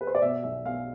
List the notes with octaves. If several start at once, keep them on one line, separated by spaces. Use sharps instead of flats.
B4
C5
D5
B2 E5
B1 E5
B2 F5